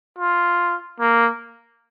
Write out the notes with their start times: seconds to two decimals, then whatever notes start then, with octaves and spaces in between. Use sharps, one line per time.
0.19 F4
1.00 A#3